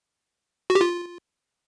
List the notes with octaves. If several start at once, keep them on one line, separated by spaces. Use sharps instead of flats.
F#4
G4
F4